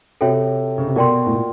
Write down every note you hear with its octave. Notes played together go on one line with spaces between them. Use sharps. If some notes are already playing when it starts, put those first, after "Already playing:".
C3 F#4 A4 C#5 E5 G5
C#3
C3
B2 F#4 A#4 D5 G5 C6
A2
A#2